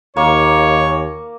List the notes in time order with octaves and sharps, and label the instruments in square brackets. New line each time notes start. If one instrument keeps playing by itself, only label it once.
[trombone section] D#2 [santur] A#3 [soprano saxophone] C#5